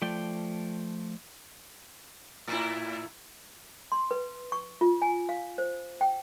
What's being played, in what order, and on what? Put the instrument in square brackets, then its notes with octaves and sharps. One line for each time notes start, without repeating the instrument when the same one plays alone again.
[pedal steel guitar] F3 A3 D5 G5
[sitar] A2 E4
[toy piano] C6
B4
C#6
F4
G#5
F5
C5
G5